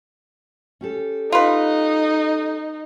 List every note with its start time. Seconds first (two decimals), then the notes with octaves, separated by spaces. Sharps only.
0.81 C#4 G4 A4
1.32 D#4 F4 B4